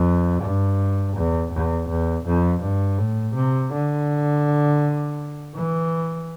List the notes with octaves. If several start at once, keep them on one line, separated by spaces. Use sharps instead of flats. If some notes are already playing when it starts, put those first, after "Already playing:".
Already playing: F2
G2
E2
E2
E2
F2
G2
A2
C3
D3
E3